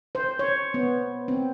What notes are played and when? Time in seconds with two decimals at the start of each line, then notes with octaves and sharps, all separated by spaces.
0.15 C5
0.39 C#5
0.74 B3
1.28 C4